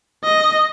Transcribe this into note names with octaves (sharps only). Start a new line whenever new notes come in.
D#5